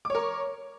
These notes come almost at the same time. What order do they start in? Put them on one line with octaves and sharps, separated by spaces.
D6 C#5 A#4